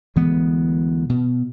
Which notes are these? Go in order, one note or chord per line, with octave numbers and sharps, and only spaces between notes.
D2 E3 G#3 B3
B2